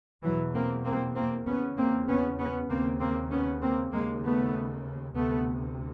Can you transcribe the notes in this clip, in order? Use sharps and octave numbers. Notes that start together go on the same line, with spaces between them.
E2 B2 E3 F#3
A#3 C4
A#3 C4
A#3 C4
E2 C#3 B3 C#4
A#3 C4
B3 C#4
B3 C#4
D#2 C#3 A#3 C4
A#3 C4
B3 C#4
A#3 C4
D#2 C#3 G#3 A#3
A3 B3
D2 C3 A3 B3